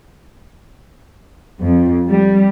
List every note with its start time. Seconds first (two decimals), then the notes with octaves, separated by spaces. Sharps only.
1.61 F2
2.09 G3